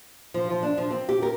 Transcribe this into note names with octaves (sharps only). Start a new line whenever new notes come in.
F3
F3
D4
F3
C4
G4
A#4